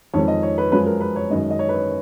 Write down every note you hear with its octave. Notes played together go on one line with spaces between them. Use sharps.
F2 D#3 G#3 C#5
D#5
C#5
B4
F#2 F3 G#3 B4
A#4
B4
C#5
F#2 D#3 G#3 D#5
D#5
C#5
B4
C#5